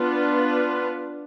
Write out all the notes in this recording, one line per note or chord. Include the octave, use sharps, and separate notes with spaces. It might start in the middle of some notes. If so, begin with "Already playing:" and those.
Already playing: B3 D4 F4 B4